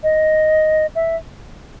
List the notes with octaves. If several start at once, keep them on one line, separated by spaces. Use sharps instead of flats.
D#5
E5